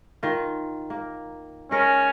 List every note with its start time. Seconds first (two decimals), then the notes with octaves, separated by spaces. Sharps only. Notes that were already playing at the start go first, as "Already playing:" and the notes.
0.23 D#3 F4
0.90 A#3
1.71 G#3 C#4 A#4